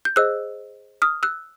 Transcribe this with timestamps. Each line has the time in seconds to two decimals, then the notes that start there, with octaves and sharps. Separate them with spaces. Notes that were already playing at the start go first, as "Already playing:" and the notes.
0.05 G6
0.16 G#4 C5 D#5 E6 F#6
1.02 D#6 F6
1.23 E6 F#6